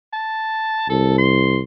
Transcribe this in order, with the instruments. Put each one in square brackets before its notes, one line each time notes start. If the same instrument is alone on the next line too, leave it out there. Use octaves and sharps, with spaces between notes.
[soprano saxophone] A5
[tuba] C2 [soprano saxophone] A4
[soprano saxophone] C6